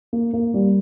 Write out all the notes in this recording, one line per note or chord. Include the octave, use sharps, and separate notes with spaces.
A#3
A#3
G3